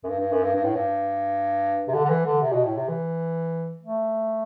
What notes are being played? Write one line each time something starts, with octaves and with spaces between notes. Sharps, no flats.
F#2
G2
G2
F#2
G2
G2
A2
G2
C3
D3
D3
E3
D3
C3
B2
A2
C3
E3
A3